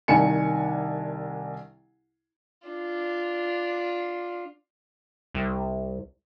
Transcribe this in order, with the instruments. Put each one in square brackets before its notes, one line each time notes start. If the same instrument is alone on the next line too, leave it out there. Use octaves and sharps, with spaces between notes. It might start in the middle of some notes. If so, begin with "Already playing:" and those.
[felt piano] C2 D#3 D4 G#5 C#7
[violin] D4 F4
[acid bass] C2